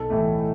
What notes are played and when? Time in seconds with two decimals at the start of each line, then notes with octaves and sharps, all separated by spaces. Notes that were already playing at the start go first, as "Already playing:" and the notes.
Already playing: B1 A4
0.10 A2 E3 A3